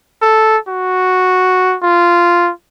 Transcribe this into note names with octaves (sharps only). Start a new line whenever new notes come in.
A4
F#4
F4